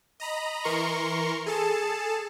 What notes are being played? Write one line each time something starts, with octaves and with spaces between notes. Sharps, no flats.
D#5 A#5 B5
E3 A#4 A#5 C6 C#6
G#4 A4 A5